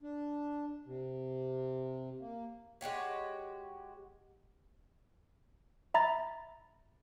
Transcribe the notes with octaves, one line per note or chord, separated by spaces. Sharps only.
D4
C3
A#3
G#3 F#4 G4 C#5
E5 A#5 B5 A6